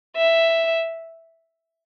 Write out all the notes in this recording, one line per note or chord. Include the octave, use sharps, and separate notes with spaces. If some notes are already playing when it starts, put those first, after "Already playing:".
E5